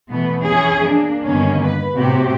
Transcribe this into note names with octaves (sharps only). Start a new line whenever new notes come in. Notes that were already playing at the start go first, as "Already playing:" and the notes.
B2 E3 A3 B3
E3 C#4 G#4
A#3 D4
G2 D3 D#3 A#3 B3 C#4
B4
A2 C3 C4 F#4 G4